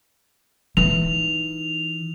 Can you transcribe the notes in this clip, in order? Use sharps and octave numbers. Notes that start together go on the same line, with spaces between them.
E3 D#4 F7